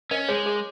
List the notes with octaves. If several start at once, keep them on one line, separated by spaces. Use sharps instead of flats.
C#4 A#4 D#5
G#3 G#4 C#5
G#4